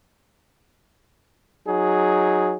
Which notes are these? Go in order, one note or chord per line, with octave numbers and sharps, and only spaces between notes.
F#3 D#4 G#4